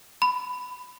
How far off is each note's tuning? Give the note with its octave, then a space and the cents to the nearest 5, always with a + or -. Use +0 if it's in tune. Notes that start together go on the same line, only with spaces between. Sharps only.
B5 +15